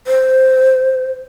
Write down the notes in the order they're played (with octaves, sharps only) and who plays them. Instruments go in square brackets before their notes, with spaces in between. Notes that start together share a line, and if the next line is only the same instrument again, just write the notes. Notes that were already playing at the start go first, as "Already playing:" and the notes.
[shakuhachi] C5